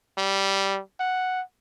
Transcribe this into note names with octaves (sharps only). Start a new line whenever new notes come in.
G3
F#5